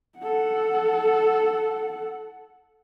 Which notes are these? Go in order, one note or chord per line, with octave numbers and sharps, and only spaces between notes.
A4 F#5